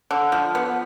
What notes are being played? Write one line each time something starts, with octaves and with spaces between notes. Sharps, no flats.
D3
F3
B3